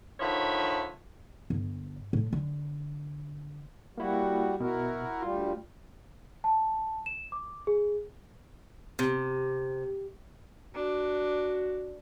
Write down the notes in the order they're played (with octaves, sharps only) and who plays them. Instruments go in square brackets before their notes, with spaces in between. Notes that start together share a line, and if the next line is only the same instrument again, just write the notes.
[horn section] D3 D#3 F3 C#5 E5 B5
[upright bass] G1
A2
D3
[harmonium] G3 F#4 [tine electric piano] A#3 E4
[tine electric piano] B2 [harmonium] E4 F#4 A#4
[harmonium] D2 G3 [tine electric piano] F4
[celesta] A5
E7
D6
G#4
[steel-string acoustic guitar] C3
[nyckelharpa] D4 [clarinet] F#4